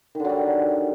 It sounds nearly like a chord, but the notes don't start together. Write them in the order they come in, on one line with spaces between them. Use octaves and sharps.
D#3 D3 F#3 G3